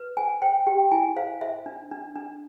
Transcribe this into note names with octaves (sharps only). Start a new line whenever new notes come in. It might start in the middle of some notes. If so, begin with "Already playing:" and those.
Already playing: B4
C5 G#5
C5 G5
G4 G5
E4 G#5
C5 F5
C5 E5
D4
D4
D4